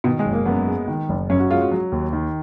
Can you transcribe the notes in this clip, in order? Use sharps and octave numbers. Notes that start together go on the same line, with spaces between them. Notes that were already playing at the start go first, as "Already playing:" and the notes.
B2 D#3
G#3
F#1
A#3
F#2 B3
G#3
D#3
F#1
F#2 C#4
F#4
G#3 F4
F#4
F#3
D#2
D#3